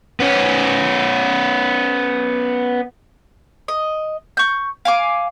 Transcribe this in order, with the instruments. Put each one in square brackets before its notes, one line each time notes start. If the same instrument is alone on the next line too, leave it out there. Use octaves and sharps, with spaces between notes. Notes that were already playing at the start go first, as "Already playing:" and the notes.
[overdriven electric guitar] B3 C#4
[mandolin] D#5
C#6 G6
F5 G#5 D6